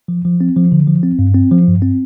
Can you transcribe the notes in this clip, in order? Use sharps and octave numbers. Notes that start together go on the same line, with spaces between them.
F3
F3
C4
F3
D3
F3
C4
G2
C4
F3
G2
C4